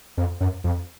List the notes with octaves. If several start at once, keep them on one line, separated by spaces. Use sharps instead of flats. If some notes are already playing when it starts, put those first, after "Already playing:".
F2
F#2
F2